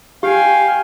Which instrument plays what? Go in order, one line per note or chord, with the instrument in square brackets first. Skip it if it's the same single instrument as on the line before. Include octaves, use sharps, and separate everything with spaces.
[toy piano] G4 [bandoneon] F5 [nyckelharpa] G5 G#5